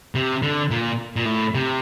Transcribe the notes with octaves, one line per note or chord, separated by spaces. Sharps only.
C3
D3
A#2
A#2
A2
C3